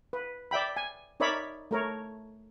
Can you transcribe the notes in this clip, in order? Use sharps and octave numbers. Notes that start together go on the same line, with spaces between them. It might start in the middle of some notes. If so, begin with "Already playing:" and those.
B4
D5 E5 G5 B5
G#5
D#4 A#4 C#5 D5 E5 B5
A3 A#4 C#5